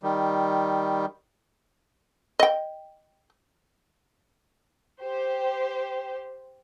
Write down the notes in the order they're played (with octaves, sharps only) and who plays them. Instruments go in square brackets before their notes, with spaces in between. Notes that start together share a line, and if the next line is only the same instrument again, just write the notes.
[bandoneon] D#3 G3
[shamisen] D#5 G5
[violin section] G4 C5